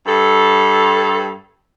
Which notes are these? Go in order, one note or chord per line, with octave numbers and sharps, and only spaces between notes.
G2 A4